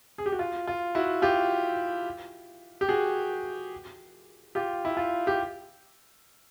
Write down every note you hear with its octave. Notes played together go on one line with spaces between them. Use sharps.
G#4
G4
F#4
F4
F4
E4 F#4
F4 G4
G4
F#4 G#4
F4 G4
E4
F4
G4